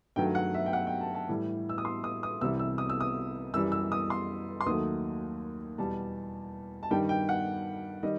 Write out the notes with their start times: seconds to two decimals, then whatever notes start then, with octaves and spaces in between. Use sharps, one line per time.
0.16 G2 D#3 F#3 A3 G5
0.35 F#5
0.54 E5
0.66 G5
0.73 F#5
0.87 G5
1.01 A5
1.14 A5
1.29 A2 E3 G3
1.69 E6
1.78 D#6
1.85 C6
2.04 D#6
2.23 D#6
2.41 C2 C3 E3 G3 E6
2.59 E6
2.78 D#6
2.89 E6
3.01 D#6
3.54 F#2 E3 G3 E6
3.72 E6
3.92 D#6
4.10 C6
4.61 C6
4.66 D#2 D#3 F#3 A3 D#6
5.78 E2 B2 G3 A5
6.83 A5
6.91 G2 D#3 G3 G5
7.09 G5
7.29 F#5
8.03 D#3 G3 D#5